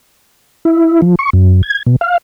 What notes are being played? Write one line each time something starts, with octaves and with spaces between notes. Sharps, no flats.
E4
F3
C#6
F#2
G#6
B2
F5